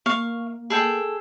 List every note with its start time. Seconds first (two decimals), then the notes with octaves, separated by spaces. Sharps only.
0.06 A#3 F5 C#6
0.70 G#4 A4 G5